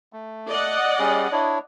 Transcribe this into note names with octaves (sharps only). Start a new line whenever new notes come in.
A3
D5 D#5 F#5
G3 C#4 G#4
D4 E4 C#5